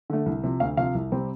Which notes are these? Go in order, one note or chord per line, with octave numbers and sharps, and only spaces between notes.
D3 A3
C2
C3 F3
D2 F5
C3 F3 F5
C2
C3 G3 C4